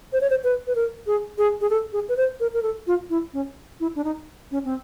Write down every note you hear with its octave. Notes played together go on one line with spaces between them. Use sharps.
C5
C#5
C5
B4
B4
A#4
G#4
G#4
G#4
A4
G#4
B4
C5
A#4
A#4
A4
F4
E4
C#4
E4
D4
D#4
C#4
C4